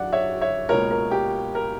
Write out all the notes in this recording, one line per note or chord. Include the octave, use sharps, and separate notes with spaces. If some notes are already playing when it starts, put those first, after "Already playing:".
Already playing: F#2 D3 D5 F#5
C#5 E5
C#5 E5
C#2 B2 A#3 A#4 C#5
A#4
G4
A#4